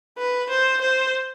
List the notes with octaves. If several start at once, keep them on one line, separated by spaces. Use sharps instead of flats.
B4
C5
C5